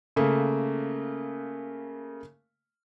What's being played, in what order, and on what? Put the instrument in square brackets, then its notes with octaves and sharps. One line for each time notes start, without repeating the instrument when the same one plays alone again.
[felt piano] C#3 A3 A#3